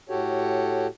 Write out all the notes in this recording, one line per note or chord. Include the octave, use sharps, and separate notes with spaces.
A2 F#4 G4 A4 C#5